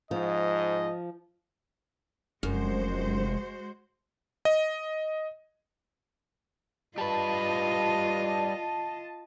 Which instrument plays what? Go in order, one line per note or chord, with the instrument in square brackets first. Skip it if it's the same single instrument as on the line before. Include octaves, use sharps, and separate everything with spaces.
[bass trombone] G#2 [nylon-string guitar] F3 [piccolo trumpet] D#5
[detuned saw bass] F1 [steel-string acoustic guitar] F#2 [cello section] G#3 F#4 C5
[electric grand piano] D#5
[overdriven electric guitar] G3 B4 [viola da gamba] F4 D#5 [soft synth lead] A5